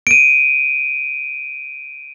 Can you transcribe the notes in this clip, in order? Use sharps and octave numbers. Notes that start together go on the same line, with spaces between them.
D7 D#7